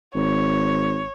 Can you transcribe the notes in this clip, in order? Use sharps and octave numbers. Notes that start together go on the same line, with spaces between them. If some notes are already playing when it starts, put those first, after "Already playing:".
G#1 C#5